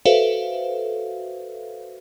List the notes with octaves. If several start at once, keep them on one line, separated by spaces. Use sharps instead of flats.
F#4 A4 B4 C5 E5 F5